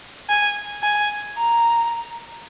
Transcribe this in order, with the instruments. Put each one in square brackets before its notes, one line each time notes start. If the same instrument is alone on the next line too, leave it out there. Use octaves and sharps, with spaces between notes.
[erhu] G#5
G#5
A#5